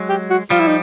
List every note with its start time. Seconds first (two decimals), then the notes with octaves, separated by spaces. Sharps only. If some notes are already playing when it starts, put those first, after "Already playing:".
Already playing: F#3 G#3
0.09 G4
0.30 F#4
0.50 F3 G3 F4
0.60 E4
0.68 D#4